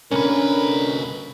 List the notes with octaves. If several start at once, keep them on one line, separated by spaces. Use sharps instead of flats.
C2 D3 C#4 A#4 B4